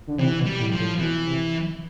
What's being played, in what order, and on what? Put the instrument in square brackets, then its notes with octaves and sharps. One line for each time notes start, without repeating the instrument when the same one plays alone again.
[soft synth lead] D3
[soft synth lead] C3 [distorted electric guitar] E3
[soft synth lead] B2
[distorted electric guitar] G3
[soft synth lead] A2
[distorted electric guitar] F3
[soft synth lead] A2
[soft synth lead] B2 [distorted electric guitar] E3
[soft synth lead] C3